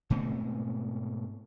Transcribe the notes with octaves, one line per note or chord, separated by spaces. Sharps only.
G#2 B2 A3 C4